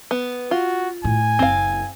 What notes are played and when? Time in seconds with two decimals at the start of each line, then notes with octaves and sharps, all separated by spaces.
0.11 B3
0.51 F4 F#4
1.04 A2 G#5
1.39 F#1 C4 F5